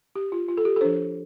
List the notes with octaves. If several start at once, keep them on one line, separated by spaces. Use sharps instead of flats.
G4
F4
F4
A4
G4
A4
F3 D4 C5